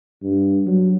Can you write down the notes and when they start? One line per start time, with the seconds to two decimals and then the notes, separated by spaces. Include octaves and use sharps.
0.23 G2
0.66 F#3